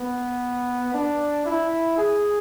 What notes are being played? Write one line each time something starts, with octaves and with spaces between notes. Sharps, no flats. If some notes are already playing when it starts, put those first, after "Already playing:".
Already playing: B3
D4
E4
G#4